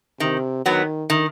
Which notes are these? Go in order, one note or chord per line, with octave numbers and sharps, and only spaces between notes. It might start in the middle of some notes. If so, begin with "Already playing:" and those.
C3 D#3
D#3 F#3 B3
D#3